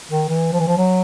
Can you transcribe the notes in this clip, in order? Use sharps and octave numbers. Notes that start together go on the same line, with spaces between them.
D#3
E3
F3
E3
F3
F#3